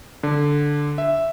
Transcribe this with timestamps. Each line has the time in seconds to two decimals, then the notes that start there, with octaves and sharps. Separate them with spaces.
0.23 D3
0.98 E5